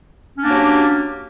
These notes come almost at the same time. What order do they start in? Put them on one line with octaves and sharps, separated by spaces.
C#4 D4 A#3 F#3 G4